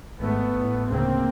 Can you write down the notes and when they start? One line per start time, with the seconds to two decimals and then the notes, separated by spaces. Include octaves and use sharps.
0.20 G#1 G#2 A3 B3
0.55 A1 A2
0.89 D2 C#3 A#3 C4